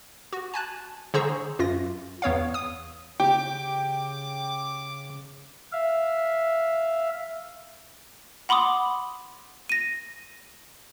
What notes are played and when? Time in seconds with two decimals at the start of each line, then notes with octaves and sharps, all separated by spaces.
0.33 F#4
0.54 G#5 A5 F#6
1.14 D3 G#4 C5 A#5 C#6 E6
1.59 F#2 F4 A#6
2.22 E2 B3 C#5 F5
2.54 D#6
3.20 C#3 G4 G5 D6
5.72 E5 F5
8.49 F#5 B5 C6 D6 D#6
9.69 A#6 D#7